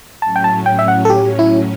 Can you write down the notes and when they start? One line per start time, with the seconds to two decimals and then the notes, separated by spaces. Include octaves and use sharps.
0.22 A2 F#3 C#4 A5
0.36 G5
0.44 A5
0.66 G5
0.79 E5
0.88 F#5
1.05 A4
1.10 G4
1.39 E4